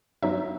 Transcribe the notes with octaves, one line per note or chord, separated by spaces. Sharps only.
G2 F#3 B3 D#4 E5